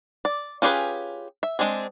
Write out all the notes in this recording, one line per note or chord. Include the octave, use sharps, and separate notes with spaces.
D5
C#4 F4 G4 G#4 B4
E5
G#3 C4 D4 G#4